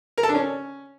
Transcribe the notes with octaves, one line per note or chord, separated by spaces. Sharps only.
A#4
A4
D4
C#4